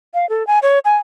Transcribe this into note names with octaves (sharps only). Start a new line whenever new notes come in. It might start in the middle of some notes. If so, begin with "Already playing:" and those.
F5
A4
G#5
C#5
G#5